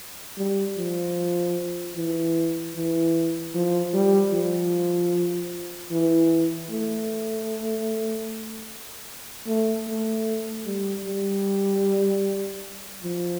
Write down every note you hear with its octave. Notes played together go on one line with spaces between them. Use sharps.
G3
F3
E3
E3
F3
G3
F3
E3
A3
A3
A3
G3
G3
F3